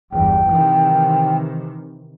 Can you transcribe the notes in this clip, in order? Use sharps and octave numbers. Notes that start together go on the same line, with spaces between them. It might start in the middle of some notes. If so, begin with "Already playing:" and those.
G1 E2 G2 G5
C3 D#3 E3